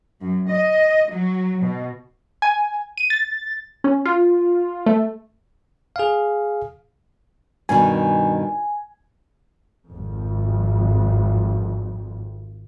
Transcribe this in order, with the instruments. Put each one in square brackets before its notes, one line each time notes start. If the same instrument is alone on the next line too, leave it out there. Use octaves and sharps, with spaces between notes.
[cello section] F#2
D#5
F#3
B2
[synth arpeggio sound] G#5
D#7
A6
C#4
F4
A3
[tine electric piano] G#4 F5
[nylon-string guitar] G2 B2 D#3 [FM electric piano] G#5
[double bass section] G#1 F2